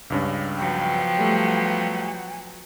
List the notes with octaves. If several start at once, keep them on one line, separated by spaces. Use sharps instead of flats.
C#2 G2 C#4
F3 F#3 B3 G5
G3 A3